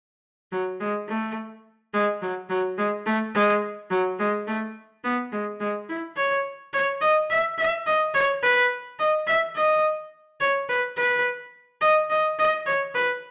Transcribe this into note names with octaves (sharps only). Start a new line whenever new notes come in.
F#3
G#3
A3
G#3
F#3
F#3
G#3
A3
G#3
F#3
G#3
A3
B3
G#3
G#3
E4
C#5
C#5
D#5
E5
E5
D#5
C#5
B4
D#5
E5
D#5
C#5
B4
B4
D#5
D#5
D#5
C#5
B4